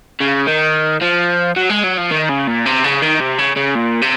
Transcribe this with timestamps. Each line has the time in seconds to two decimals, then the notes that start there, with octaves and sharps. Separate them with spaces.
0.21 C#3
0.47 D#3
1.02 F3
1.57 F#3
1.70 G#3
1.84 F#3
1.98 F3
2.11 D#3
2.29 C#3
2.47 A#2
2.66 C3
2.84 C#3
3.02 D#3
3.20 C3
3.38 C#3
3.56 C#3
3.75 A#2
4.01 C3